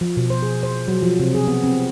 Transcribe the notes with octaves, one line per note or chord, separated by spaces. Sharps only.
F3
B2
C5
G#4
C5
F#3
F3
C3
G#4
B3
C4